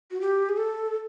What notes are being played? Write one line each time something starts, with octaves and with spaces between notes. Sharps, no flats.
F#4
G4
G#4
A4